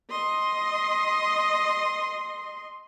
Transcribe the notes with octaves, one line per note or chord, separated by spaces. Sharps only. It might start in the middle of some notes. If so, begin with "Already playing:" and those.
D#5 C6